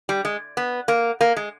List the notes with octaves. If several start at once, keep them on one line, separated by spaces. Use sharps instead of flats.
G3
G#3
B3
A#3
A#3
G#3